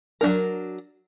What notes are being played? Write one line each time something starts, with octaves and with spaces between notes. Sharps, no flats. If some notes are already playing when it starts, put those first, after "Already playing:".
F#3 A3 D4 A#4